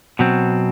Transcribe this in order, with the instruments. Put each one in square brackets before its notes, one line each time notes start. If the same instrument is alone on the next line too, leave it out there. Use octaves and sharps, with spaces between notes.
[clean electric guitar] B2 F#3 C4